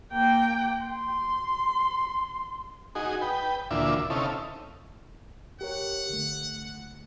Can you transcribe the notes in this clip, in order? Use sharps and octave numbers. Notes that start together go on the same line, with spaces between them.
A#3 G5
C6
D#4 F#4 G#4
B4 G5
D2 A#2 E3 D4 F4 E5
C3 C#4 D#4 E4 A4 F5
G4 A#4 C#5 F#5
D3 A3